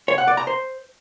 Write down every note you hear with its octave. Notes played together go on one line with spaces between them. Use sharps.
C#5
F#5
D5
A#5
C5